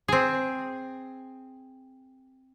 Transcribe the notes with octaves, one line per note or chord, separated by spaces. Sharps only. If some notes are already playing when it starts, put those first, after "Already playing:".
C4 G#4